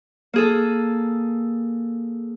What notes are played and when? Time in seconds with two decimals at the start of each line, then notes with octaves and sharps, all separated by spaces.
0.33 A#3 G#4 A4